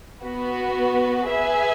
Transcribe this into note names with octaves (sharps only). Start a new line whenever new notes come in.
B3 F#4 B4
G#4 B4 E5 G#5